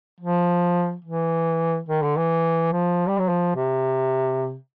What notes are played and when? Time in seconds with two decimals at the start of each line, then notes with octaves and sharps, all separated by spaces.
0.20 F3
1.04 E3
1.88 D#3
2.03 D3
2.17 E3
2.73 F3
3.07 G3
3.18 F#3
3.28 F3
3.56 C3